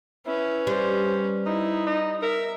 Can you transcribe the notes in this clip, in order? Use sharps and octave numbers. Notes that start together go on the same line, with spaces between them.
C#4 E4 B4
G3 C5
D#4 E4
D#4
A#4 E5